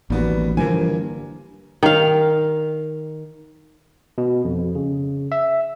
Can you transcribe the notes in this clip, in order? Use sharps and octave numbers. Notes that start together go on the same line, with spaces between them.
A1 D#2 G3 B3 F#4
G2 D3 E3 F3 A#3 G#5
D#3 F5
B2
F2
C#3
E5